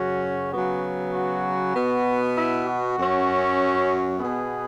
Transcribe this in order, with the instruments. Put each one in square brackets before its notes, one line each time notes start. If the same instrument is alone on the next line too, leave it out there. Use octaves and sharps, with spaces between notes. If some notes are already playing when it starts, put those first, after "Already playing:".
Already playing: [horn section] F#2 C#3 F#3 C#4 F#4
C#3 F#3 B3 F#4
F#4
B2 B3
E4
F#4
F#2 F#3 C#4
B2 B3 G#4